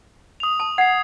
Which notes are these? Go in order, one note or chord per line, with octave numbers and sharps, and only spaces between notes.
D#6 F7
A5
F#5 G#6 C7